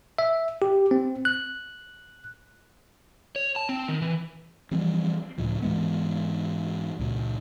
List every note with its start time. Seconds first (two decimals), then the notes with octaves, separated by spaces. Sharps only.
0.19 E5
0.62 G4
0.91 C4
1.25 F#6
3.36 C#5
3.56 A5
3.69 C4
3.88 D#3
4.02 E3
4.71 E3 F3 G3 C4
5.38 C#2 A2 F3
5.62 G#2 E3 G#3 B3
6.99 C#2 A#2